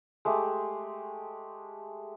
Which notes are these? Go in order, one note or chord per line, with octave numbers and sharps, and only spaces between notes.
G#3 A3 G4